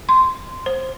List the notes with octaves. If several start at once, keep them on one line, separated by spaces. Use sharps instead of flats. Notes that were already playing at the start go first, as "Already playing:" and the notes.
C6
C5